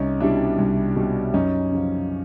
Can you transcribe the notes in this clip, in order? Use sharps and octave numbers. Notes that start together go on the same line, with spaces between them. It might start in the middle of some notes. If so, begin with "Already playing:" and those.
Already playing: C2 C#4 D#4
B2 G3 D4 E4
C2
B2 G3
F#2 C#4 D#4
C#3 F3